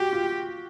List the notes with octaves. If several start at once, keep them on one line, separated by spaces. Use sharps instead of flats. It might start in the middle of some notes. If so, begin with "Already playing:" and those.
Already playing: F#4 G4
F4